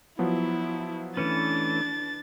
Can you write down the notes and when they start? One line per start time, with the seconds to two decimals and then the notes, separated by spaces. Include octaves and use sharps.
0.19 F3 F#3 B3 E4
1.17 E3 A3 C#4 D4 B4 A6